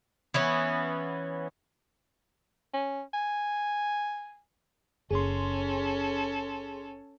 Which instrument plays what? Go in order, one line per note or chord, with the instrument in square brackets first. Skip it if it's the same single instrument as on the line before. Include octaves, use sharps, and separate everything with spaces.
[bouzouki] E3 B3 C#4
[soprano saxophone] C#4
G#5
[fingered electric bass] F#1 [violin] C#4 A4 [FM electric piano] G#4 C6